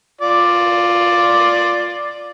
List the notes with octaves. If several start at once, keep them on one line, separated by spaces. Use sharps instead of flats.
F4 D5